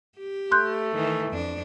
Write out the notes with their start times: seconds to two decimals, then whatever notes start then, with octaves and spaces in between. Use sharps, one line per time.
0.18 G4
0.51 A3 C6 F#6 G6
0.94 D#3 E3
1.31 F2 D4